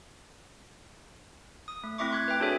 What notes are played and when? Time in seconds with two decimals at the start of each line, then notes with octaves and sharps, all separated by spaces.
1.68 D#6
1.84 A3
1.98 A3 C4 E4 E5 C#6 D6
2.11 C6 F#6 G#6
2.28 B4 E5 G5
2.40 D4 F#4 G#4 A4 C#5 E5